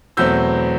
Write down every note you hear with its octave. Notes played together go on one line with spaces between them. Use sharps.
E2 B2 F#3 A3 C4 E6 G6